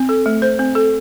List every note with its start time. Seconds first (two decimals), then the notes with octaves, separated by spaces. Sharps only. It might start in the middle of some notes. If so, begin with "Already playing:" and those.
Already playing: C4
0.09 A4
0.26 A3
0.42 C5
0.59 C4
0.75 A4